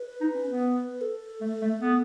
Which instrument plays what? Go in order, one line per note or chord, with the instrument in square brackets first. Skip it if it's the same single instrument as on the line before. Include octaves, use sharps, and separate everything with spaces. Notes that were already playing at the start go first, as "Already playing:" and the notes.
Already playing: [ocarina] B4
[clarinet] D#4
C#4
B3
[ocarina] A4
[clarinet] A3
A3
B3